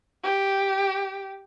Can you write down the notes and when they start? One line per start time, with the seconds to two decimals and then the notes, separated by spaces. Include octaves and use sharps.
0.24 G4